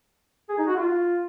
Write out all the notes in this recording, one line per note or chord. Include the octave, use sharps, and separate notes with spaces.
G#4
D#4
F#4
F4